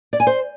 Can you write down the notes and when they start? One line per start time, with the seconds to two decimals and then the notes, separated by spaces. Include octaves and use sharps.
0.13 D5
0.20 G#5
0.27 C5